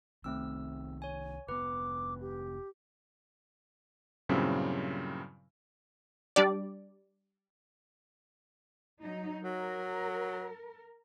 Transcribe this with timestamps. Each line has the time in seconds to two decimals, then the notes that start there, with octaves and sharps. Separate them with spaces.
0.24 C2 D#3 A3 C4 E6
1.02 C#5 G#5
1.49 F1 B3 B4 D6
2.21 G4
4.29 G2 A#2 C#3 F#3 C4 E4
6.36 G3 D4 G4 D5
9.02 F#3 D#4
9.43 F#3 A#4